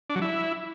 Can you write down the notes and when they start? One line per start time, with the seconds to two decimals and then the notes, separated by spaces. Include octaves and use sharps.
0.10 D4
0.16 F#3
0.22 E4